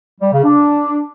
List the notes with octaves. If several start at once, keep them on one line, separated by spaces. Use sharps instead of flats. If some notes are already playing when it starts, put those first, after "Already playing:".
G3
C#3
D4